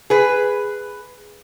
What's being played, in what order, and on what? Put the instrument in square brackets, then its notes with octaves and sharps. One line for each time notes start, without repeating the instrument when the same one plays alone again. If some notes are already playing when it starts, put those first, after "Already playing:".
[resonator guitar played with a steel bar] G#4 B4